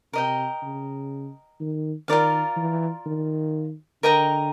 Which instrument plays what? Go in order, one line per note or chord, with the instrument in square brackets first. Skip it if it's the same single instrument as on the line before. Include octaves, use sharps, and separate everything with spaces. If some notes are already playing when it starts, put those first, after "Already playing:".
[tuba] C3 [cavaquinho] A#4 D#5 G5
[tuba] C#3
D#3
[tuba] D#3 [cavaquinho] F4 A#4 D5 F5
[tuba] E3
D#3
[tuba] D3 [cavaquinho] A#4 D#5 G5 A#5